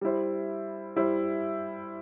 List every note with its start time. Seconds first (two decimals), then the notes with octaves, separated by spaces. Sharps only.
0.01 G3 E4 C5
0.96 G3 E4 C5